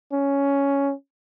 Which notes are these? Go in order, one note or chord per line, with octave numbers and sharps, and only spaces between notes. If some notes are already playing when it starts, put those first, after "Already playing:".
C#4